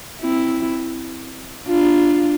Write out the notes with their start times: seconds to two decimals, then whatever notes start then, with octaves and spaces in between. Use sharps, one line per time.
0.21 C4 E4
1.68 D4 F4